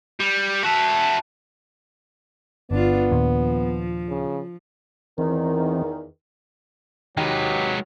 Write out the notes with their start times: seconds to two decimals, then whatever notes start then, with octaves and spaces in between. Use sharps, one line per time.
0.20 G3
0.64 F#4 E5 A5
2.71 G1 B3 D4 F4
3.11 D#2 A#2 F3
4.09 C#3
5.18 E2 D#3 E3 C4
7.17 D#3 F#3 G#3 G4 B4